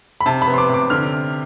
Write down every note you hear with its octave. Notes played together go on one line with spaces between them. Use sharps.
B5
C3 A5
B5
B3
C6
D6
C3 D6
D3 F6